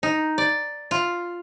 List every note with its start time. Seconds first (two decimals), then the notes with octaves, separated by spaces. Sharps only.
0.03 D#4
0.38 D5
0.91 F4